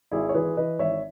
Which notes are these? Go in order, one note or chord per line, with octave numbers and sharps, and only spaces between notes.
G#1 E4 G#4
C#5
E3 G#4 B4
E3 B4 D#5
G#1 C#5 E5